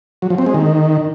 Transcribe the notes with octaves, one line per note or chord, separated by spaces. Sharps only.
F#3
F3
C4
G#3
D#3